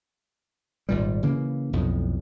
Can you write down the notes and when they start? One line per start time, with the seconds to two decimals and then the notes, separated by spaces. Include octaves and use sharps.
0.89 G#1 A#2 G3
1.23 C#3 E3 A#3
1.73 B1 F2 A2